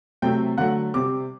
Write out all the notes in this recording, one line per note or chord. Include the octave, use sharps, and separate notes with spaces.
C3 F#3 A3 C4 G5
D3 F#3 A3 F#5
C3 G3 C4 D6